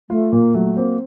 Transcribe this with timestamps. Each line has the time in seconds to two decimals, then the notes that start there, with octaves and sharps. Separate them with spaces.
0.10 A3 F4
0.32 A#2 A#3
0.54 F#3 A3
0.77 A#3 C4